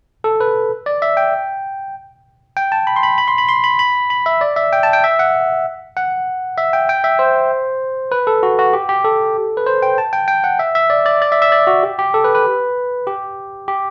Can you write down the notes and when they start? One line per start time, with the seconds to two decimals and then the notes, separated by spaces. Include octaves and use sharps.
0.24 A4
0.40 B4
0.86 D5
1.02 E5
1.17 G5
2.57 G5
2.72 A5
2.87 B5
2.96 C6
3.03 B5
3.18 B5
3.28 C6
3.38 B5
3.49 C6
3.64 B5
3.79 B5
4.10 B5
4.26 E5
4.41 D5
4.56 E5
4.73 G5
4.83 A5
4.93 G5
5.04 E5
5.19 F#5
5.97 F#5
6.58 E5
6.73 G5
6.89 G5
7.04 E5
7.19 C5
8.12 B4
8.27 A4
8.43 F#4
8.59 F#4
8.73 G4
8.89 G4
9.05 A4
9.57 B4
9.66 C5
9.83 G5
9.98 A5
10.13 G5
10.28 G5
10.44 F#5
10.59 E5
10.75 E5
10.90 D5
11.06 D5
11.22 D5
11.32 E5
11.42 E5
11.52 D5
11.67 F#4
11.83 G4
11.99 G4
12.14 A4
12.24 B4
12.35 B4
13.07 G4
13.68 G4